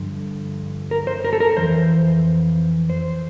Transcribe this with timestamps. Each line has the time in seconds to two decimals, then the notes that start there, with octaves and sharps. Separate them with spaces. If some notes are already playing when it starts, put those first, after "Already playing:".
Already playing: G2 D3 F3
0.91 A#4
1.07 C5
1.24 A#4
1.33 A4
1.40 A#4
1.57 F2 E3 C5
2.90 C5